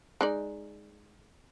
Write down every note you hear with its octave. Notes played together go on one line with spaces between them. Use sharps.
G#3 D#4 D5